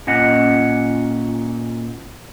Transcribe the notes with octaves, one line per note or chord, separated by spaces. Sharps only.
A#2 C#4 D#5 F#5